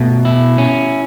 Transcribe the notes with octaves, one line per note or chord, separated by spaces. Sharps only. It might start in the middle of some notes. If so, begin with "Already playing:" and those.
Already playing: B2 A3
E4
C#4